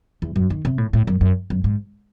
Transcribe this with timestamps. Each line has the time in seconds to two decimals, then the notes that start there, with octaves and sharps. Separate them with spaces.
0.22 E2
0.36 F#2
0.50 D#3
0.65 C3
0.78 A2
0.93 A2
1.07 F#2
1.21 F#2
1.50 F#2
1.64 G#2